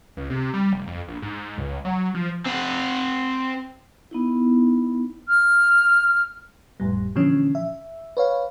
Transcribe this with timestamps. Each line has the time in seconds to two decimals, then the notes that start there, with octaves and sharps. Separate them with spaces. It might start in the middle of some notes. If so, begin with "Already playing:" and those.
0.17 C#2
0.30 C3
0.54 G3
0.73 F1
0.87 F2
1.08 A#1
1.22 G#2
1.58 C#2
1.85 F#3
2.15 F3
2.46 C4 F#5
4.11 B3 D#4 E4
5.28 F6
6.80 G#1 F2 A2 G3
7.15 A#2 D3 E3 F3 C#4
7.55 E5
8.17 B4 C#5 F5